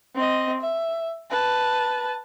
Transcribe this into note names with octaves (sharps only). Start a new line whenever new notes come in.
C4 D#5
E5
B4 A5